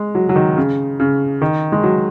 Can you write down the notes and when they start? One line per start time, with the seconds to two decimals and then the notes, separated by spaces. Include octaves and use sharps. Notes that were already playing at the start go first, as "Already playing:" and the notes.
Already playing: G#3
0.15 F#3
0.29 F#3
0.36 D#3
0.57 C#3
1.00 C#3
1.42 D#3
1.72 G#3
1.83 F#3